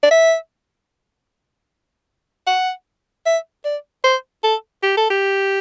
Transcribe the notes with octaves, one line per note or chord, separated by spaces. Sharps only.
D5
E5
F#5
E5
D5
C5
A4
G4
A4
G4